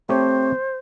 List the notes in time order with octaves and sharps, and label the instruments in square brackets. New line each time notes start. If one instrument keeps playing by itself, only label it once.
[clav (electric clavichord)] A3 G4 C#5 [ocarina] C4 [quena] C5